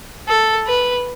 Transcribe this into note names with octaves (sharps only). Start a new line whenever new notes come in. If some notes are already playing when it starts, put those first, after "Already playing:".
A4
B4